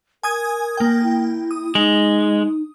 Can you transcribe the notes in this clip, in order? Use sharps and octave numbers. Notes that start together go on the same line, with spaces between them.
A#4 G#5 D#6 G#6
A#3 G5
E4
D#6
G#3 D#4